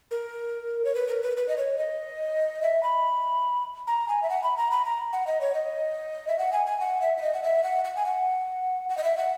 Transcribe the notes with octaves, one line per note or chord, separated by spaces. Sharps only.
A#4
C#5
B4
A#4
B4
B4
D#5
C#5
D#5
E5
B5
A#5
G#5
E5
F#5
B5
A#5
B5
A#5
F#5
D#5
C#5
D#5
E5
F#5
G#5
G#5
F#5
E5
E5
D#5
F#5
E5
F#5
F#5
G#5
F#5
F#5
D#5
E5
F#5